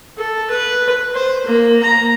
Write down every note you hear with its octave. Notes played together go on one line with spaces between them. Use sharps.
A4
B4
C5
A#3
A#5